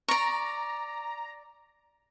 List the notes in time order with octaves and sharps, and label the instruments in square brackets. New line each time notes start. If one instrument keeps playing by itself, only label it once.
[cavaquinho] D5 C#6 [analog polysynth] A#5